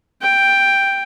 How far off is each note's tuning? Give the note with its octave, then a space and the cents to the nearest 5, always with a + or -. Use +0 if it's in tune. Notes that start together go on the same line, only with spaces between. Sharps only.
G5 +5